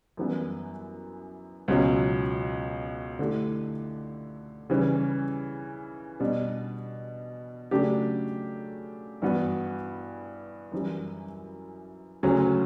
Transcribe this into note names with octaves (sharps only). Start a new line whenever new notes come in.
F#2 E3 G3 B3
C#2 B2 F#3 C#4
D3 A3 E4 G4
C#3 E3 G3 C#4
B2 G3 D4
C#3 F#3 A3 D4 G4
G2 E3 B3 F#4
F#2 E3 G3
D2 C#3 F#3 C#4